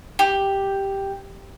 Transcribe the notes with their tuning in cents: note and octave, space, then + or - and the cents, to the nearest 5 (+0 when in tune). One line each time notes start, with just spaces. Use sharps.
G4 +0